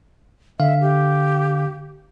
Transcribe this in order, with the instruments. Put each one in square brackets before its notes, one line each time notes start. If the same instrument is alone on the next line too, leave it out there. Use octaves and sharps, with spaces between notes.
[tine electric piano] D3 F5 [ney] E5
[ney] G4